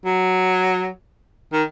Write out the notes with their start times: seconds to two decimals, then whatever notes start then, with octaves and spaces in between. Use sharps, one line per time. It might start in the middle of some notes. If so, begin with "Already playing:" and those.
0.05 F#3
1.53 D#3